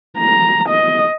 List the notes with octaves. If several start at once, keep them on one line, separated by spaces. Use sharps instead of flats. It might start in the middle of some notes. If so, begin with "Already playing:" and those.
A#5
D#5